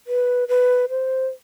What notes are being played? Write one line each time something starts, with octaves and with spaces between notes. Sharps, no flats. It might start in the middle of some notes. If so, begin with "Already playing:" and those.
B4
B4
C5